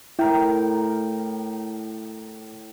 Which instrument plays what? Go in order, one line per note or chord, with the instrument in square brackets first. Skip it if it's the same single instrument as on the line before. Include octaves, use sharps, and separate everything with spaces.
[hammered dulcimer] A2 A#4 G5 [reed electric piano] E4